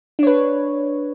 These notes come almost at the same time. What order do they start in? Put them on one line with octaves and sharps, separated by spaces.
D4 C#5 B4